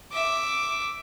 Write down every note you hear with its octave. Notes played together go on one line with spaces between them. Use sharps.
E5 D6